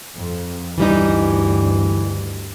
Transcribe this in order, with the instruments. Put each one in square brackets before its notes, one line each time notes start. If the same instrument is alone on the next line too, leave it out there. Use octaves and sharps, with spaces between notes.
[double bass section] F2
[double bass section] D2 G2 [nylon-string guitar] E3 G3 D#4